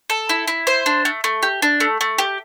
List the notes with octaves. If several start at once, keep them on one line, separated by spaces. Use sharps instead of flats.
A4
E4
E4
C5
D4
A3
A3
G4
D4
A3
A3
G4